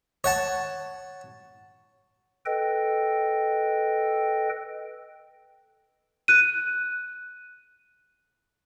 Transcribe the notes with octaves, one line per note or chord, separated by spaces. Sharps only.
C#5 F#5 A5
A4 B4 D#5 G5
F#6 D#7